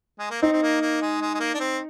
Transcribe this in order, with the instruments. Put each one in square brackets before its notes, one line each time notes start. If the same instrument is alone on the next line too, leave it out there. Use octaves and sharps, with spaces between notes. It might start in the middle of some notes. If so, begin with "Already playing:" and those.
[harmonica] G#3
A#3
[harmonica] C4 [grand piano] D#4
[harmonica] C4
A#3
A#3
G#3
G#3
G#3
A#3
D4
C4